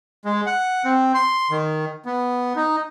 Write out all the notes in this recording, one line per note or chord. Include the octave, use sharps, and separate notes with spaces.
G#3
F#5
C4
C6
D#3
B3
D#4